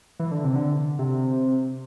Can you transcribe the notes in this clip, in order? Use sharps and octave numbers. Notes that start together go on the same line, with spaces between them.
E3
D3
C3
D3
C3